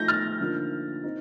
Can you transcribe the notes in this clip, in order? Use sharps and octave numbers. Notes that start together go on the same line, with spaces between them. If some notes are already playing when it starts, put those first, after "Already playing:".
Already playing: F3 A3 D#4 G6 A#6
F6 A6
D3 F3 A#3 D#4
C4 D#4